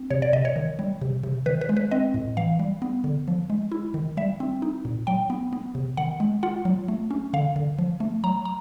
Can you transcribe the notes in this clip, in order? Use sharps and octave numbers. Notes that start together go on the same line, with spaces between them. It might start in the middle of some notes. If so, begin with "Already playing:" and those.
Already playing: C4
C3 C#5
D5
C3 D#5
C#5
D#3
G3
C3
C3
D#3 B4
B4
G#3
B4
C4 D#5
A2
E3 F5
G3
B3
D3
F3
G#3
E4
D#3
G3 E5
C4
D#4
A#2
F#3 G5
B3
B3
C3
D#3 F#5
G#3
F4 F#5
F#3
A3
C#4
D3 F5
D3
F3
A3
F#3 A#5
A#5